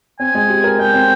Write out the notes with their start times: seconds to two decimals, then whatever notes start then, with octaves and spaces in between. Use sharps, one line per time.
0.20 C4 G#5
0.35 G#3
0.49 G4
0.64 A#4
0.79 G#3 G5
0.94 C4